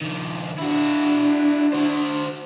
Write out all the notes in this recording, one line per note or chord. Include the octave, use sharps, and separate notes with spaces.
D#3 F3
D4 E4 F#4
F#4 C5